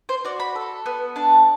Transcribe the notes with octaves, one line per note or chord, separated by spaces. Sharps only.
C5
F#4 D5
B5
A4
B3
D4 A5